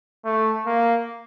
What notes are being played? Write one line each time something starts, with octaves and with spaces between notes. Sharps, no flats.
A3
A#3